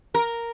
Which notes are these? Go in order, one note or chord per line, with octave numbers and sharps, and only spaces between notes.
A#4